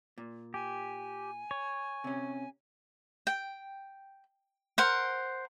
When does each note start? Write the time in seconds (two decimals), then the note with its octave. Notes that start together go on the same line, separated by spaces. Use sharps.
0.18 A#2
0.54 G4 G#5
1.51 C#5
2.04 C3 C#4
3.27 G5
4.78 A#4 C5 F#5